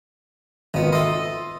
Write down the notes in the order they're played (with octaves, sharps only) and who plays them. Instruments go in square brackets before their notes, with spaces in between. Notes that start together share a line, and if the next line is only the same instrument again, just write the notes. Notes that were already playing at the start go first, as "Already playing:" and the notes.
[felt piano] G#1 F4 [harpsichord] D#3 B3
[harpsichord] A4 D#5 [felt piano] E5 C6